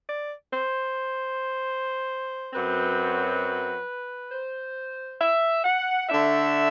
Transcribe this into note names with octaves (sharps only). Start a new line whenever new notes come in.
D5
C5
F#2 F#3 C4 B4
C5
E5
F#5
D3 A3 D4 E5